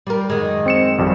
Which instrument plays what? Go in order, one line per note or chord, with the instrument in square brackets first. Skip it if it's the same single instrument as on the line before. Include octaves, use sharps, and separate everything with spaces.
[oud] G3 F4 A#4
F#2 D#3 G#3
[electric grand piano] C4 C#7 E7
G#1 F2 G3